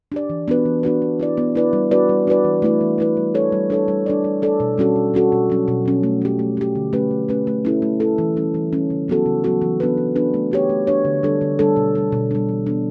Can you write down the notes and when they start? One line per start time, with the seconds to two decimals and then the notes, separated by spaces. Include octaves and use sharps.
0.12 D4 G4 D5
0.29 E3
0.48 B3 D4 F#4 B4
0.65 E3
0.83 B3 D4 F#4 B4
1.02 B3
1.20 E4 B4 D5
1.37 B3
1.55 E4 B4 D5
1.73 G3
1.91 D4 F#4 B4 D5
2.09 G3
2.27 D4 F#4 B4 D5
2.45 E3
2.62 A3 E4 B4
2.81 E3
2.98 A3 E4 B4
3.17 G3
3.34 D4 A4 C#5
3.52 G3
3.70 D4 A4 C#5
3.88 G3
4.06 D4 A4 D5
4.24 G3
4.42 D4 A4 D5
4.60 B2
4.78 G3 C#4 F#4 A4
4.96 B2
5.14 G3 C#4 F#4 A4
5.32 B2
5.50 F#3 C#4
5.68 B2
5.86 F#3 C#4
6.03 A3
6.22 C#4 G4
6.39 A3
6.57 C#4 G4
6.75 D3
6.93 A3 C#4 G4 B4
7.11 D3
7.29 A3 C#4 G4 B4
7.47 A3
7.65 C#4 E4 A4
7.82 A3
8.00 C#4 E4 A4
8.18 E3
8.36 G3 C#4
8.54 E3
8.73 G3 C#4
8.90 C#3
9.08 F#3 B3 F#4 A4
9.26 C#3
9.44 F#3 B3 F#4 A4
9.62 E3
9.80 B3 D4 F#4 B4
9.98 E3
10.16 B3 D4 F#4 B4
10.34 A3
10.51 D4 G4 C#5
10.69 A3
10.87 D4 G4 C#5
11.05 D3
11.23 G3 D4 A4
11.41 D3
11.59 G3 D4 A4
11.77 B2
11.95 G3 D4
12.12 B2
12.31 G3 D4
12.49 E3
12.67 B3 D4